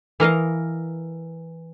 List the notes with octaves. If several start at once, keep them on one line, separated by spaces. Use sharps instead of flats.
E3 A#4 D#5 F5